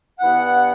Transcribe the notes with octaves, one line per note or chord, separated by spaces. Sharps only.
G2 E3 B3 E4 F#5